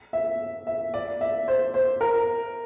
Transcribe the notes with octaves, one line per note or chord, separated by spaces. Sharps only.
E5
E5
D5
E5
C5
C5
A#4